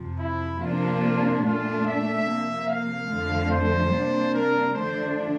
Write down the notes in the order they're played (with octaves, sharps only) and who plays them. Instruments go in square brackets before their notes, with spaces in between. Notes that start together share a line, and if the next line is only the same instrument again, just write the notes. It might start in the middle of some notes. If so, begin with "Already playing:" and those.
Already playing: [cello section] F2 C3 F3
[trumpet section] E4
[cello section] C3 F3 A#3 D4 [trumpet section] F4
[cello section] A#2 A3 D4 [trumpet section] F4
[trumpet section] E5
[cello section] C3 F3 A#3
[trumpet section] F5
[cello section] F2 D3 F3 A3
[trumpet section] C5
[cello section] C3 G3 A#3 D4
[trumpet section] A#4
[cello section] D3 F3 A3 D4 [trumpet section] C5